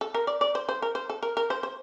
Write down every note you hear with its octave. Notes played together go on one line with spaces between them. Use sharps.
A4
A#4
D5
D5
C5
C5
A#4
C5
A4
A#4
A#4
C5
C5